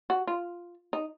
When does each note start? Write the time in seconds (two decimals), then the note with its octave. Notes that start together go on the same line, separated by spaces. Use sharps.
0.10 F#4
0.27 F4
0.93 D#4